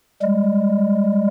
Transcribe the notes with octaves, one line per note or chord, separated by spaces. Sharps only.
G3 G#3